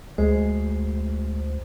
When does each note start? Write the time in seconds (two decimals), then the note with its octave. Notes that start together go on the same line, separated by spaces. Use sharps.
0.18 D2 G#3 C5